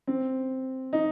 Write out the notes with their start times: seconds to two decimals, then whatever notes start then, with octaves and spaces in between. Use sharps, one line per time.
0.07 C4
0.93 D#4